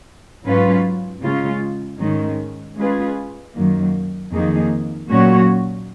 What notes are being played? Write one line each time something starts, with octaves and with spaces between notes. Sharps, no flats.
G#2 F#3 C#4 F4 B4
C#3 G#3 C#4 F4
G#2 D#3 G#3 C#4
G#3 C#4 F4 G#4 B4
F#2 D#3 F#3 A#3
F2 D#3 A#3 D#4 G#4
A#2 F#3 C#4 F#4 C#5